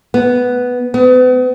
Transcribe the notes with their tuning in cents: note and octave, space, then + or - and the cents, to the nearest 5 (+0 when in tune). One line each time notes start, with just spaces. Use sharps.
B3 +0
B3 +40